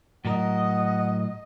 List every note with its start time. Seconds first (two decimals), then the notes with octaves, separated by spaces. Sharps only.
0.25 A2 F#3 A#4 D#5 F#5